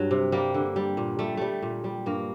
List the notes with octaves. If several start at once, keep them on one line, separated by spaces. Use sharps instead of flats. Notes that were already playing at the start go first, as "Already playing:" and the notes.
Already playing: G2 F#3
C3
G3 A#3
D3
G3
A#2
G3 A3
G3 A3
A#2
G3
G2 A#3